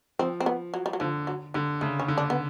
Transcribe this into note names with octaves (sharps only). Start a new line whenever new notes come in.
F3 C4
C4
B3
F#3
G3
F#3
D3 F3
F#3
D3 G3
C#3 A3
C#4
D3
D4
B3